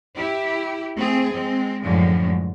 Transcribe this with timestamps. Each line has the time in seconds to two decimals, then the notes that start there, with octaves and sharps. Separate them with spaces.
0.15 E4 G4
0.97 A3 C4 G#4
1.32 G#3 C4
1.82 F#2 A2 D3 F3 G#3